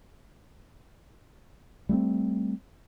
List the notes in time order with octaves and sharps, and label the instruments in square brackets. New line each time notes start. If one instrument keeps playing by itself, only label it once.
[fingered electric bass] G3 A3 B3 C4